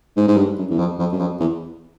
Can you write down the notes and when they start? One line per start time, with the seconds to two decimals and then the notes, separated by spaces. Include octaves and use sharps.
0.17 G#2
0.28 G#2
0.37 G2
0.58 F#2
0.70 E2
0.79 F2
0.99 F2
1.12 F#2
1.20 F2
1.40 E2